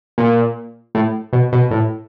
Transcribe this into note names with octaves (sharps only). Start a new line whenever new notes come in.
A#2
A2
B2
B2
A2